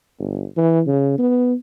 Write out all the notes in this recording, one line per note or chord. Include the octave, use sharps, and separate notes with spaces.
G1
E3
C#3
B3